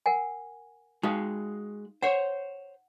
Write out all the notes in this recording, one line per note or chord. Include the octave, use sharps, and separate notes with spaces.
A#4 F#5 G#5
G#3 D#4 F#4 F5 D#6
C5 C#5 F#5